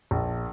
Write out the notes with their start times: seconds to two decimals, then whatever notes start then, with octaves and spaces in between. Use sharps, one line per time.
0.11 A#1